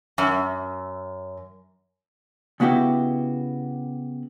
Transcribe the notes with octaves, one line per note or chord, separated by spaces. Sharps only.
F#2
C#3 B3 E4 F#4 G4